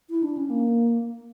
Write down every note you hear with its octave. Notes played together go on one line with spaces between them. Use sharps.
E4
D4
C#4
A#3